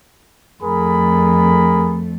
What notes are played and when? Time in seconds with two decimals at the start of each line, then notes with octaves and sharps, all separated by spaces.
0.63 F2 A3 G#4 A#4 B5